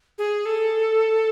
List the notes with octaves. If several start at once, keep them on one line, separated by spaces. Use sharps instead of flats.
G#4
A4